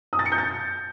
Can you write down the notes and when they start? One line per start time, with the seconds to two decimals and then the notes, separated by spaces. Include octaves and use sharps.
0.13 D#6
0.19 A6
0.25 C#7
0.32 G6
0.38 A6